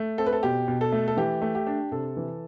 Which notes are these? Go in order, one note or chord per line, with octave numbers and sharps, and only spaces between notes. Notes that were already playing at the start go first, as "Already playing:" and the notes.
Already playing: A3
C4 A4
B4
A4
B2 G4
B2
A4
A3
A4
E3 G4
A3
G4
D4
C3 A4
E3